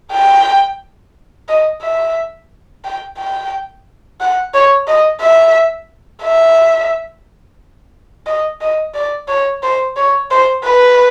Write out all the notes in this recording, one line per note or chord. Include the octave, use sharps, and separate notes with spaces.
G5
D#5
E5
G5
G5
F#5
C#5
D#5
E5
E5
D#5
D#5
D5
C#5
C5
C#5
C5
B4